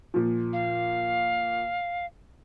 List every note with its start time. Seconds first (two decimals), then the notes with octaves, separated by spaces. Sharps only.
0.14 A#2 F3
0.53 F5